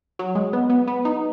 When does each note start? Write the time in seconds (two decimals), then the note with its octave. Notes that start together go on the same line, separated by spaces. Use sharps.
0.19 F#3
0.35 G#3
0.53 B3
0.70 B3
0.88 B3
1.05 D#4